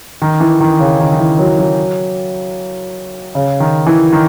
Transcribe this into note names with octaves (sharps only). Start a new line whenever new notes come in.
D#3
E3
D#3
C#3
D#3
D#3
E3
F#3
F#3
C#3
D#3
E3
D#3